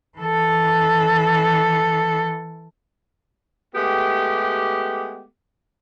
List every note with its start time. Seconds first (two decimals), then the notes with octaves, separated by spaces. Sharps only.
0.18 E3 A4
3.75 G#3 A3 B3 G4